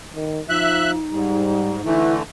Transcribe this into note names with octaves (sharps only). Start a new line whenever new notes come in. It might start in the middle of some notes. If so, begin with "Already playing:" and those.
D#3
F3 D#4 E5 F#6
G#2 G3
D3 E3 A3 E4